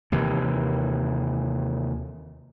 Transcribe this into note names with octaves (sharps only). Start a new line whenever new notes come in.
D#2 C3 D#3 E3